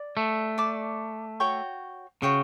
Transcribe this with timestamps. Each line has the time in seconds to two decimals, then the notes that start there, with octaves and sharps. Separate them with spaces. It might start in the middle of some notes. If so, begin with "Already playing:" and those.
Already playing: D5
0.17 A3
0.58 D5 A5 D6
1.40 F#4 C#5 G5 C#6
2.22 C#3 F#4 C#5 G5 C#6